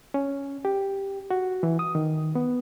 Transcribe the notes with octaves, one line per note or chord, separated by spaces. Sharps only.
C#4
G4
F#4
E3
D#6
D#3
B3